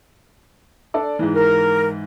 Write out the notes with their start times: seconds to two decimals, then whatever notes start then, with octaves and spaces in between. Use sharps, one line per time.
0.94 D4 A4 D5
1.19 G#2 E3
1.36 A#4